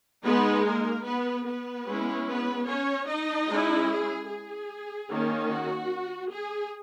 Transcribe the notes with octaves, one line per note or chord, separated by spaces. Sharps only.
G#3 B3 D#4 B4
A#3 A#4
B3 B4
B3 B4
G#3 C#4 E4
B3 B4
C#4 C#5
D#4 D#5
G#3 C#4 E4
G#4
G#4
D#3 A#3 C#4
F#4
G#4